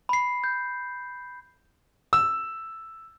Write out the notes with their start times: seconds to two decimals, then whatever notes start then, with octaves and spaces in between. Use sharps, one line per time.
0.09 B5 C7
0.44 G6
2.13 E6